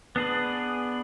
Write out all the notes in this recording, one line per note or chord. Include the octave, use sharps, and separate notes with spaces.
B3 D4 G#4 B4